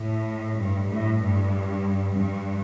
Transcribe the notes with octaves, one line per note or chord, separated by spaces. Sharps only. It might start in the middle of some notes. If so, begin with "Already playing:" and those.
Already playing: A2
G2
A2
G2
G2